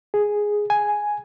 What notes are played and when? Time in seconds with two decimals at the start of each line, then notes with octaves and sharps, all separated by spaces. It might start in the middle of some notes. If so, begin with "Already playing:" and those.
0.14 G#4
0.70 G#5